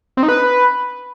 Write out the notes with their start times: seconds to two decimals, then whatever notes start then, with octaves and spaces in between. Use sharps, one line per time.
0.17 C4
0.23 D#4
0.29 B4